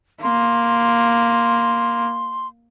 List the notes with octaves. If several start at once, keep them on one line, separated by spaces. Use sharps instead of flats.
A#3 C6